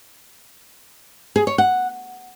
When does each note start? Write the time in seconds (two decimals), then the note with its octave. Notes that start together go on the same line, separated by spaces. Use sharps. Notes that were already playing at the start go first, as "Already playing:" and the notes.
1.36 G#4
1.47 C#5
1.58 F#5